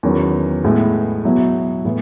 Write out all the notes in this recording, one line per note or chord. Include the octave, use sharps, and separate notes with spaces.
E2 D#3 F#3 C#4
A2 G#3 B3
B2 F#3 B3 E4
A2 E3 B3